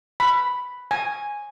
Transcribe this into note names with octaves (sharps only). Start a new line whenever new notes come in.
B5
G#5